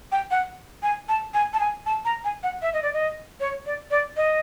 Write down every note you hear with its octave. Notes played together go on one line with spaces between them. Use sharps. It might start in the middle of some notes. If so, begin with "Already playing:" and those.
G5
F#5
G#5
A5
G#5
A5
G#5
A5
A#5
G#5
F#5
E5
D#5
D5
D#5
C#5
D5
D5
D#5